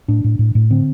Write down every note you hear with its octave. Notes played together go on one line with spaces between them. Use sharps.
A2 D4
A2
A2
A2
D3 C4